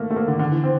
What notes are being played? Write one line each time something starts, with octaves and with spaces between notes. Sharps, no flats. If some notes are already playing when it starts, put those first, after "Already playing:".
Already playing: A3 A#3
A3
A#3
D3
D3
E3
C4